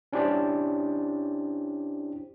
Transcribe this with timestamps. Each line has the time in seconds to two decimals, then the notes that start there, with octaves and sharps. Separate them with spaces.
0.13 C#4 D4 E4 G4 C5 D5